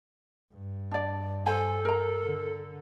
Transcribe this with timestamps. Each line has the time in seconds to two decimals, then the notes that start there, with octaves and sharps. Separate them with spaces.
0.54 G2
0.91 D4 D5
1.46 A4 C5 G#5
1.85 A#4 A#5
2.24 D3